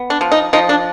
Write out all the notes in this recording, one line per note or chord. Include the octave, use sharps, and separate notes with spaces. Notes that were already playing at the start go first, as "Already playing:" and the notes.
Already playing: B3
D4
F3
D#4
F3 D#4
D4